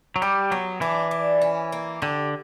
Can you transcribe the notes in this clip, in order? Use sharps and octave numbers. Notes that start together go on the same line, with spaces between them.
F#3
G3 G4
F#3 B3
E3 D4
D4
C#4
A#3
D3 G4